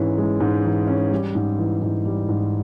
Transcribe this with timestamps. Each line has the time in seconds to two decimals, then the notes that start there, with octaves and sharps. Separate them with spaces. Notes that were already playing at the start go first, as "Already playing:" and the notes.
Already playing: G#2 E3 G#3 C#4
0.18 G#3
0.40 G#2
0.64 E3
0.87 C#4
1.11 G3
1.35 G#2
1.59 E3
1.82 G#2
2.06 G3
2.29 G#2